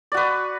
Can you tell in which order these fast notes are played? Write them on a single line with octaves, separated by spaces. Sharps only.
D5 F#4 B4